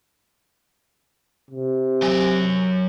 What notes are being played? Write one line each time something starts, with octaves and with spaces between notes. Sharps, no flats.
C3
F#3 G#5